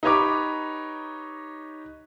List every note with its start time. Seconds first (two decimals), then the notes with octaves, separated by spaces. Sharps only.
0.03 D#4 G4 B4 C#5 A#5 D6